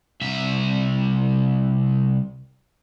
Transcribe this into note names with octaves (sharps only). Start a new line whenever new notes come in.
C2 E5